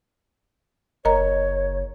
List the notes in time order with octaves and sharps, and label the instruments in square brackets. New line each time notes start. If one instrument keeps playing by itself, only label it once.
[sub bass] F#1 [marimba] A#4 D#5 A#5 [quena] C#5